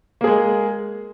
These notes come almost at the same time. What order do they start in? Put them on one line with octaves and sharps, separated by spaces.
A#3 G#4 G#3